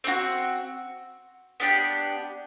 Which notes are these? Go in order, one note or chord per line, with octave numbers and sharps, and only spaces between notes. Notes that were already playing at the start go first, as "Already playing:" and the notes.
C4 D#4 F#4
B3 D4 G4